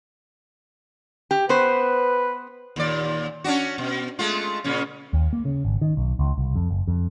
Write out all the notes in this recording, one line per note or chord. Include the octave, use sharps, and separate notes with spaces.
G4
B3 B4 C5
D#2 A#2 D5
C#4 D4 F#4
B2
G#3 A3 F4
A#2 C#3 C#4
D#2
A#3
C#3
G#1
D#3
B1
C#2
C2
F2
F#1
F2